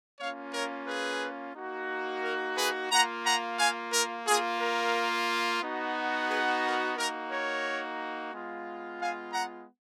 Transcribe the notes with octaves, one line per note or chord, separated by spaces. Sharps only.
A#3 C#4 F4 C#5 F5
A#4 C#5
G#4 B4
A#3 D#4 F#4
A#4
G#4 B4
A#3 F4 F#5 A#5
F#5 A#5
F5 G#5
A#4
A#3 F4 G#4
A#4
B3 D#4 F#4
G#4 B4
A#4
A#3 D#4 F#4 A#4
A#4 C#5
G#3 B3 F4
F5 G#5
F#5 A#5